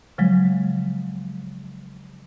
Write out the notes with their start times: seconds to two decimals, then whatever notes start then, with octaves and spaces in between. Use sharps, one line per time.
0.18 C#3 F3 F#3 G#3